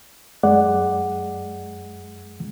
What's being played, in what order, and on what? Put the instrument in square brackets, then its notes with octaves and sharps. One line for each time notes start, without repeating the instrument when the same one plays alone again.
[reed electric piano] F#2 G#3 D5 F#5